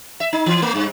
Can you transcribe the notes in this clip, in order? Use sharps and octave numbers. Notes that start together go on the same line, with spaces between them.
E5
D#4
E3
A3
G2